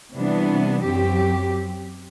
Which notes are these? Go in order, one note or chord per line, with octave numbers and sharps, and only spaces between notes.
C3 E3 G3 B3 D4
F#2 F#3 C4 G4